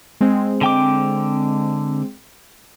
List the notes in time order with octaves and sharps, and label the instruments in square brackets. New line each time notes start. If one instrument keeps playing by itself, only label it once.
[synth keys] G#3 C4
[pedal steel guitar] D3 G5 D6